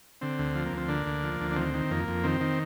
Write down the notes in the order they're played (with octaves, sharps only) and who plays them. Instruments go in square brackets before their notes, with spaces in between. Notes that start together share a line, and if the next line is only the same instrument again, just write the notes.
[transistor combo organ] D3 C4
D2
F3
A#3
D2 C4
D3 A#3 D4
D2
F3
D2
D4
D#3 C4
D#3
F2 A#3
F2
D#3 C4
D#3